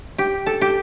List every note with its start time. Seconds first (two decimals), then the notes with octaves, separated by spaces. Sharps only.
0.18 G4
0.46 A4
0.61 G4